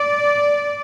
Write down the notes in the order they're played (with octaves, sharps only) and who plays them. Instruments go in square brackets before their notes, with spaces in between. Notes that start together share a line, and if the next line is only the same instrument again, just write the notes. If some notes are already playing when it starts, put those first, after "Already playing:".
Already playing: [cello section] D5